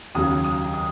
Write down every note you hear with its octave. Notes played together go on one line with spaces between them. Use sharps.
D#2 C#3 F#3 D#6
D#6
D#6